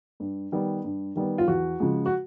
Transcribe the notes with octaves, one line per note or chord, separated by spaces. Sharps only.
G2
D#3 G3 B3
G2
D#3 G3 B3
F4
E2 F#4
C#3 F3 G#3
F#4